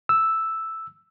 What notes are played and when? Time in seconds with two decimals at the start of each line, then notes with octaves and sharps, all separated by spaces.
0.09 E6